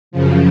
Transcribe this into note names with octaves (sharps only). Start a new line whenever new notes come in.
F#2 C#3 F3